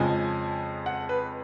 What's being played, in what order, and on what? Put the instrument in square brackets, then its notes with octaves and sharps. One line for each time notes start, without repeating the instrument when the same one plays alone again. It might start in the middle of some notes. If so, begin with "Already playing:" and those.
Already playing: [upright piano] F2 C#3 F3 G#3 G#5
F#5
B4